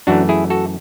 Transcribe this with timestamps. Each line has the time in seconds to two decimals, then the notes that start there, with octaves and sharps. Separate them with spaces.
0.07 F#2 E3 A3 D4 F#4
0.29 E4 G#4
0.50 F#4 A4